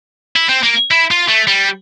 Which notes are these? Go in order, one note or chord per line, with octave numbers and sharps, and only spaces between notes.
E4
C4
A#3
E4
F4
A3
G3